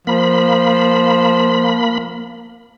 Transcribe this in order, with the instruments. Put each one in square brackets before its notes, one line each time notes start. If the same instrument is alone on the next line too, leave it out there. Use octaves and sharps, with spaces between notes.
[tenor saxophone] F3 [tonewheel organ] A#3 B5